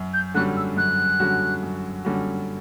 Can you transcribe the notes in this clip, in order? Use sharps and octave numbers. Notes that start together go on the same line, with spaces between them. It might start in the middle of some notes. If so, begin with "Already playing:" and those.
Already playing: F#2
G6
D3 G3 C#4 F#4 F#6
E6
F#2 F#6
D3 G3 C#4 F#4
F#2
D3 G3 C#4 F#4